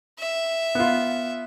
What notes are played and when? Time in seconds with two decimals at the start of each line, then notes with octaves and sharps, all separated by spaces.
0.19 E5
0.75 B3 F4